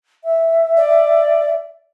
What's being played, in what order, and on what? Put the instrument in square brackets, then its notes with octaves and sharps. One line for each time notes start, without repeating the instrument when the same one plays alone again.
[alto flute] E5
[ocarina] D5